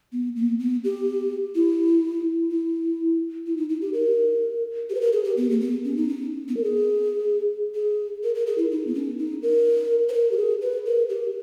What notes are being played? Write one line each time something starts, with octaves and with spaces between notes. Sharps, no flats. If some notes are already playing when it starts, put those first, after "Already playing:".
B3
A#3
B3
G4
E4
E4
E4
D#4
D#4
G4
A#4
G4
B4
A#4
G#4
G4
B3
A#3
B3
C#4
D#4
C#4
B3
A#4
G#4
G#4
A#4
A#4
G#4
E4
D#4
B3
C#4
D#4
A#4
B4
A#4
G4
G#4
B4
A#4
G4